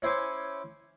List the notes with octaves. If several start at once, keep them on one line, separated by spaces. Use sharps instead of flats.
C#4 E4 C5 G#5 D6